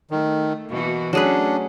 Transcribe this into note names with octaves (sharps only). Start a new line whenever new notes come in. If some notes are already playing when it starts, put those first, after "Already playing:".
D#3 A3
B2 E3 A#3 F#4
F#3 A3 C#4 D4 G#4 B4